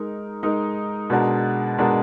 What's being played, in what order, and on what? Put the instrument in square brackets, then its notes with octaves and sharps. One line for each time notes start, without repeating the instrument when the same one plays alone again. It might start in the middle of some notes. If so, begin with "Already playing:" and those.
Already playing: [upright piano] G#3 D#4 A#4
G#3 D#4 A#4
B2 G#3 D4 F#4 A#4
B2 G#3 D4 F#4 A#4